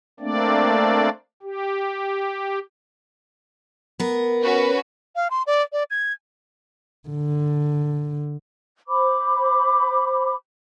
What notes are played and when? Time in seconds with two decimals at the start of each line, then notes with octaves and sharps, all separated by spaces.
0.20 A3 A#3 C4 D4 D5
1.43 G4
4.00 B3 A#4
4.44 C#4 F#4 B4
5.16 F5
5.30 C6
5.47 D5
5.73 D5
5.90 G#6
7.09 D3
8.88 C5 B5 D6